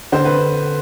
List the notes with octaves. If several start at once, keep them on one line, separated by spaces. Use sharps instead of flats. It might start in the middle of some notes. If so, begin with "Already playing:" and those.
D3 C5
B4